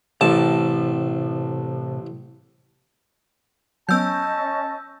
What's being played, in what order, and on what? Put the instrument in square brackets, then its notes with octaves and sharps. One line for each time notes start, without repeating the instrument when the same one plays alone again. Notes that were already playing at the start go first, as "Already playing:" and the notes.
[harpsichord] A1 A5 [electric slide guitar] A2 C3
[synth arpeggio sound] F#3 B3 [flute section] C#4 D#5 [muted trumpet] A5 [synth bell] E6 G6